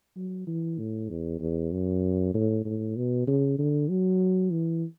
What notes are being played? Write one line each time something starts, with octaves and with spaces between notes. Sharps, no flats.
F#3
E3
A2
E2
E2
F#2
A2
A2
B2
C#3
D3
F#3
E3